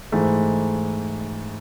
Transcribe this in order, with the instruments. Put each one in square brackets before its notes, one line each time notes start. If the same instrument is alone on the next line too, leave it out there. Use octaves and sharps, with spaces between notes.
[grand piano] G#2 E3 A3